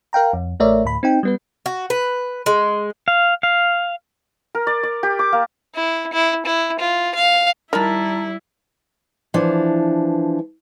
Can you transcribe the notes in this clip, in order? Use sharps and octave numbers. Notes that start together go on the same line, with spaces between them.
A#4 F5 G5 A#5
F2
A1 A3 A#4 C#5 D5 E5
D2 A2 B5
C4 D#4 G5
G3 B3 B4
F#4
B4
G#3
F5
F5
A#4
D5
D5
G4
D6
A#3
E4
E4
E4
F4
F5
D#3 G3 E4 A#4 A5 B5
E3 F3 D4